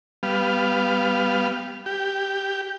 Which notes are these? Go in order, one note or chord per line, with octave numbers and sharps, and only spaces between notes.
G3 B3 F5
G4